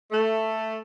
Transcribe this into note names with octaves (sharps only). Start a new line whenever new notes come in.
A3